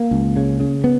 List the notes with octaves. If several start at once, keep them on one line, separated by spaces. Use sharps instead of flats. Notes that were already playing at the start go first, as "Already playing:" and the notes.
Already playing: A#3
C#2
C#3
C#3
B3